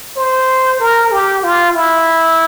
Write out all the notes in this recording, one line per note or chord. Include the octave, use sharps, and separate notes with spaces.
C5
A#4
G4
F4
E4